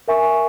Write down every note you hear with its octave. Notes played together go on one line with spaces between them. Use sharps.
A#4 E5 G#5 C#6